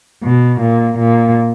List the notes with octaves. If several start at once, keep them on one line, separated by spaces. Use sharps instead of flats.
B2
A#2
A#2